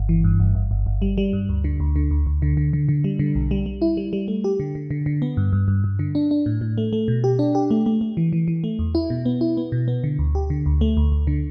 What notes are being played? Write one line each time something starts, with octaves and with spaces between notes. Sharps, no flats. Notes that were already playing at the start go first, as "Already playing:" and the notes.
Already playing: G1
E3
G2
G1
G1
G1
G1
G3
G3
G2
D2
D3
D2
D3
D2
D2
D3
D3
D3
D3
G3
D3
B1
G3
G3
E4
G3
G3
A3
G4
D3
D3
D3
D3
B3
G2
G2
G2
G2
D3
D4
D4
A2
A2
A3
A3
B2
G4
D4
G4
A3
A3
A3
E3
E3
E3
A3
E2
E4
B2
B3
E4
B3
B2
B3
D3
D2
G4
D3
D2
A3
D2
D2
D3